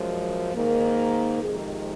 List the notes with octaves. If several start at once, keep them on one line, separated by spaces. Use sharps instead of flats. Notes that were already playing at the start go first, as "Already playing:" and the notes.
Already playing: F#2 F3 G#3
G#2 D#3 A#3
F2 C3 D#3 G#3 G#4